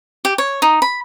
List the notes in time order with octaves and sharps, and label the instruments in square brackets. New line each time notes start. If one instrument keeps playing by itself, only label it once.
[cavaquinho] G4
C#5
D#4
B5